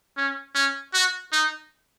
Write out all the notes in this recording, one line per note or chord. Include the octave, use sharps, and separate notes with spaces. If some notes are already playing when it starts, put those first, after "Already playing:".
C#4
C#4
F#4
D#4